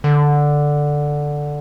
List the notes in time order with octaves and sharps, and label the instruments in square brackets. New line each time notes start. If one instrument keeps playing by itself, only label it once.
[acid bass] D3